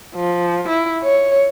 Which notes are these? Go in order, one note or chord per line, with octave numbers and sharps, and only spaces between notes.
F3
E4
C#5